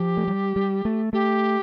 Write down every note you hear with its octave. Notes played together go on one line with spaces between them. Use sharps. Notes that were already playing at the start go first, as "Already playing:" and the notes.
Already playing: F3 G4
A3
G3
G3
A3
A3 G4